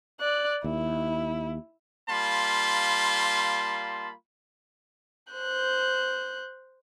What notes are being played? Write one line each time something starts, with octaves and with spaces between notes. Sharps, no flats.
D5 F#6
D#2 E4
G3 A#3 F4 A5 B5 C6
C5 F#6 G6